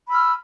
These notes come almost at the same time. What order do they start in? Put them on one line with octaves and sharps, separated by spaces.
B5 E6 F6